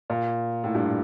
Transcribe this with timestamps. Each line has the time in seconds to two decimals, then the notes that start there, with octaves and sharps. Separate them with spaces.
0.10 A#2
0.64 A2
0.75 G2